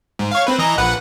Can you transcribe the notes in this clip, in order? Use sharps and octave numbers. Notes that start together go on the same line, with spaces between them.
G#2
C#5 F5
C4 B4
E3 D#5 A#5
A#1 B4 F#5